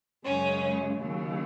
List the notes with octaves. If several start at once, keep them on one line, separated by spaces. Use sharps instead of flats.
F#2 C#3 G#3 C#4
D#2 C#3 F#3